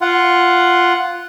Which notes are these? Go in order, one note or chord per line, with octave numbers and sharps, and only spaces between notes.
F4 F#5